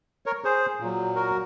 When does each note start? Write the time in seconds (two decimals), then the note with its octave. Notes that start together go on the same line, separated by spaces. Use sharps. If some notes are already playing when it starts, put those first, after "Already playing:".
0.26 A#4 C#5
0.44 G#4 C5
0.80 A#2 F#3
1.16 F#4 A#4